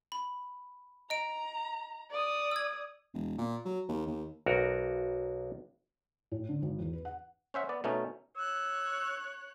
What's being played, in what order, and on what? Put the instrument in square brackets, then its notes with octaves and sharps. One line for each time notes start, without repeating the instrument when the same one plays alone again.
[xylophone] B5
[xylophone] D#5 D7 [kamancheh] A#5
[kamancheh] D5 D#6
[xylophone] E6 G#6
[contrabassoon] E1
A#2
F#3
D#2
D#2
[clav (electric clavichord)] B1 F#4 A#4
[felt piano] A2
D3
G#1
E2
B4
F#5
[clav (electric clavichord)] C#4 C5 E5 F#5
B3 D5
B2 A3 C#4 D#4
[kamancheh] C#5 F#6 [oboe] E6